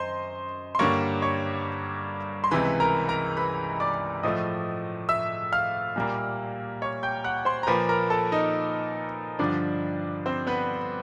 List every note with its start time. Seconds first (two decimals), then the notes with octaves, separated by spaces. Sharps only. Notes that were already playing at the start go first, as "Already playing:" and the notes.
Already playing: F#2 C5 D#5 C6
0.75 C6
0.79 G2 D3 G3 A#3 C#5 C#6
1.22 C#5 C#6
2.44 C6
2.51 C#2 C3 E3 B4 B5
2.80 A#4 A#5
3.09 A#4 A#5
3.37 B4 B5
3.80 D5 D6
4.23 A2 F3 A3 D#5 D#6
5.09 E5 E6
5.52 F5 F6
5.96 A#2 G3 A#3
6.82 C#5 C#6
7.03 G5 G6
7.24 F#5 F#6
7.45 C5 C6
7.63 A#5
7.67 A#2 F3 A#3 B4 B5
7.89 A#4 A#5
8.10 A4 A5
8.32 D#4 D#5
9.39 G2 D3 F3 D4 D5
10.26 C4 C5
10.47 B3 B4